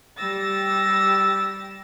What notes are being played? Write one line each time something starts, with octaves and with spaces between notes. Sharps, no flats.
G3 G4 E6 A6 A#6